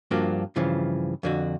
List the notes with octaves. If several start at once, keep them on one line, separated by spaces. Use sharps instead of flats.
G2 F3 A#3 D4 F#4
G2 C#3 E3 F3
F2 D3 F#4